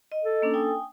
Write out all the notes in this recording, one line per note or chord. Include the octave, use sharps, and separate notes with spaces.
D#5
A4
A#3 C#4 D4
G5 G#5 D#6